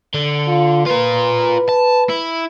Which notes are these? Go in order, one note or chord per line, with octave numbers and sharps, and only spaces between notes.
D3
F4
F4 A#4 B4
A5
E4